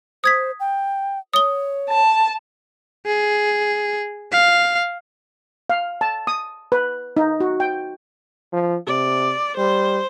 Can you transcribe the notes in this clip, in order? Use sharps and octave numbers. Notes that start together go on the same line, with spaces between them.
C5 D#6 G#6 B6
G5
C#5 D#6 G7
A5
G#4
F5
F5
A5
D#6
B4
D#4
F#4
G5
F3
C3 D5
G3 C5